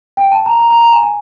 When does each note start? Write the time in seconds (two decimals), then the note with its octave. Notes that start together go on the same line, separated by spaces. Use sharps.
0.17 G5
0.32 A5
0.46 A#5
0.60 A#5
0.71 A#5
0.81 A#5
0.92 G#5
1.02 G#5